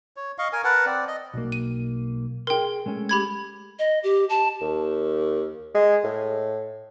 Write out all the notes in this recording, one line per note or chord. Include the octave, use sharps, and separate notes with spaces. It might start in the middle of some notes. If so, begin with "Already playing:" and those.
C#5
D#5 F5 C#6
A#4 G#5
A#4 B4 F#5 A5
C4 D5
D#5
B1 A#3
D#7
G#4 A#4 G5 C6
G#3 A3 C#4
G4 B5 G#6
D#5
G4
A5
D#2
G#3
A2